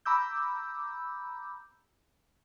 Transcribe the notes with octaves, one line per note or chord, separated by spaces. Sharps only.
A#5 B5 D6 E6 G6